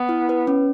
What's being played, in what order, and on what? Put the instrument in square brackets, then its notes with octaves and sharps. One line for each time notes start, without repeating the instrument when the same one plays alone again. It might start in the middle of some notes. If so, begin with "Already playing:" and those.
Already playing: [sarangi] B3
[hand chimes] E4
B4
C#4